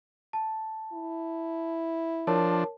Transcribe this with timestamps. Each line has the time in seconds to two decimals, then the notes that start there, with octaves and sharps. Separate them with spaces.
0.33 A5
0.93 E4
2.27 F3 D4 A#4 C#5 A5